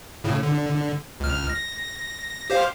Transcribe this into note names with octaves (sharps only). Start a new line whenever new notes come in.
A2 C#3
D3
C#2 F6
A#6
G4 C5 F5